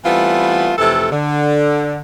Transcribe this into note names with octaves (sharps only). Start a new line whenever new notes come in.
E3 G3 A3 B3 C4 F4
F2 C3 E3 A3 A4
D3